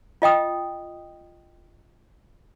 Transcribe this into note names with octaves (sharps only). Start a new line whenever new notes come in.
F4 D#5 G5 D#6